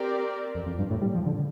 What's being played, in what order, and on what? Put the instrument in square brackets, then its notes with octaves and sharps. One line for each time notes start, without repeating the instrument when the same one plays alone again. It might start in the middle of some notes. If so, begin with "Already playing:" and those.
Already playing: [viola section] C4 G4 A#4 D5
[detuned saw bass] F2
F2
G2
A2
G3
F3
D3